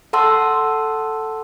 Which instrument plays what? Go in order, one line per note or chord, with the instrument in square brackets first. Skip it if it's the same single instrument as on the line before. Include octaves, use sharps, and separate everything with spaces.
[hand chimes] A4 F#5 A5 C6 E6